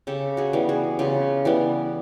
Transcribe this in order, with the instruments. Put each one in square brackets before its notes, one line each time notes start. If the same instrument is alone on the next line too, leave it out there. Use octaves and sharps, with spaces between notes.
[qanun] C#3 G4 A4
F#4 G#4
E3 G3 B3
F#4 G#4
C#3 F4 G4
E3 G3 B3